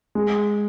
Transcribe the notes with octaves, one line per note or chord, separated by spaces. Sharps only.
G#3